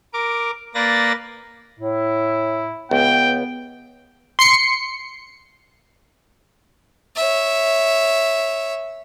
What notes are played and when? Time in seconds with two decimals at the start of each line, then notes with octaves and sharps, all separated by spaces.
0.14 A#4 D6
0.74 A#3 B4 D5 A6 A#6
1.79 A2 E4
2.91 C#2 B3 G5
4.39 C6 C7 C#7
7.16 C#5 E5